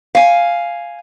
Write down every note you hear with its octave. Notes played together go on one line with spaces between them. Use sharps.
F5 G#5